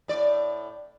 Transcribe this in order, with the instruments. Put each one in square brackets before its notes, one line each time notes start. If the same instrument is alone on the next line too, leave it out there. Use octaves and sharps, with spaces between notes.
[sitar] A2 D5